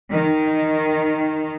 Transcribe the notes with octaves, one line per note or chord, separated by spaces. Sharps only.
D#3